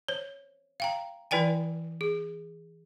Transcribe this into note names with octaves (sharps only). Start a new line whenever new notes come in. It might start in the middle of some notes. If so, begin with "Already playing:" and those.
C5 C#5
F5 G5 A#5
E3 E4 B4 D5 G5 G#5
G#4